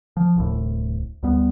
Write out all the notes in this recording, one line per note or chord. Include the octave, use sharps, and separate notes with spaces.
F3
D1 C2 A2
D2 G3 B3